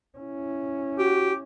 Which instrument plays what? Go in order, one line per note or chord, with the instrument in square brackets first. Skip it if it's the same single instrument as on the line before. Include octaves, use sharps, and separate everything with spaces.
[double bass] C#4 E4
[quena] F#4 [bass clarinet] G4